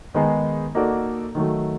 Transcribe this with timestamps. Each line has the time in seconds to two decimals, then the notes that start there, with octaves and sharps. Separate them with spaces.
0.14 D#3 G#3 B3 D#4 G#4
0.75 A#3 D#4 F#4 A4 D5
1.35 D#3 F#3 A3